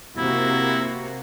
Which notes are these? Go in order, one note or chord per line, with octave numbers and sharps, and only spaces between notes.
C3 A#3 E4 F#4